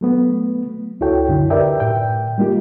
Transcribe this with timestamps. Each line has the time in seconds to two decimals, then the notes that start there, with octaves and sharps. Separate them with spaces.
0.01 F#3 A3 B3
1.01 C#2 E4 F#4 A4 C#5 G5
1.28 F#2 D3 D#4 E4
1.50 G4 A#4 B4 D5 E5 G5
1.80 A2 G5
2.38 G3 G#3 A#3 D#4 F4 G4